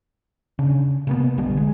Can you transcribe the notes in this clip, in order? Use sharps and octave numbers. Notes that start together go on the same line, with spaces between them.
C#3 D4
C3 A#3 B3
A#1 D3 G3 B3
G#3